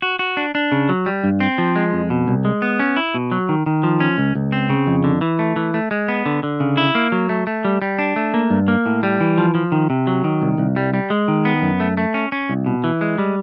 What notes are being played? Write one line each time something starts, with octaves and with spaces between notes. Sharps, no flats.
F#4
F#4
D4
D4
C#3
F#3
G3
G2
C4
F3
G#3
F2
B2
C2
G#3
B3
C#4
E4
B2
F#3
D#3
D#3
F3
C#4
C#2
C#2
C4
C#3
F2
D3
E3
A3
E3
A3
G#3
B3
D3
D3
C#3
E4
A#3
F#3
A3
A3
G3
G3
D4
A3
A#3
G2
A#3
A2
G3
E3
F3
F3
D#3
C3
F#3
D#3
C2
C2
G3
G3
G#3
D#3
B3
F#2
A3
A3
C#4
C#4
C2
B2
E3
G#3
G3